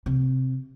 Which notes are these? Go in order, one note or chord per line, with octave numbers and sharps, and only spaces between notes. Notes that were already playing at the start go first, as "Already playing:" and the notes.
C3